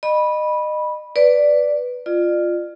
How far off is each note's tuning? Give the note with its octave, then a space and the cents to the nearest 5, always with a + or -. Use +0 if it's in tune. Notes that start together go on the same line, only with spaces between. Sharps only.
D#5 -30 B5 -15
B4 +5 D5 +0
F4 +0 D5 +40